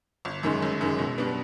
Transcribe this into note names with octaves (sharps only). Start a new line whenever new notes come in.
G1
F#2 D#3 G#3
G1
F#2 D#3 G#3
B2
G3 B3 D4